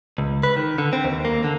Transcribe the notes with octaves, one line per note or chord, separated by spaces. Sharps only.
C#2
B4
D#3
D3
C4
D#2
A#3
D3